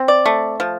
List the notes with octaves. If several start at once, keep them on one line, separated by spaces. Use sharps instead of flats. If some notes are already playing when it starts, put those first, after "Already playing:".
Already playing: C4
D5
A3
F3